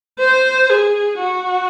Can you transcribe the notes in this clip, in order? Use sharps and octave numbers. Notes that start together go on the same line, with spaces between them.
C5
G#4
F#4